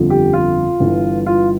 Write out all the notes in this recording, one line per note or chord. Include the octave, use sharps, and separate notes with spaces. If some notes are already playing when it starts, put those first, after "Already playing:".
Already playing: G1 F2 D3 F3
G4
F4
G1 G2 E3
F4